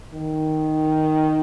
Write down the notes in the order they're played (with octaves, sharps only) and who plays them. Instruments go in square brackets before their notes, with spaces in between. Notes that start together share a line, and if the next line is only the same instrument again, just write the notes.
[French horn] D#3